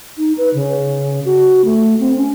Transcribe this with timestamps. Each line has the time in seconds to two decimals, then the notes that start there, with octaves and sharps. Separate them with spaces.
0.18 D#4
0.38 B4
0.54 C#3
1.25 F#4
1.65 A3
1.99 C4
2.16 C#4